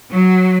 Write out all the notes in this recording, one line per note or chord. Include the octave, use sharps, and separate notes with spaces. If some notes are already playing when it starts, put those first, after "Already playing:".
F#3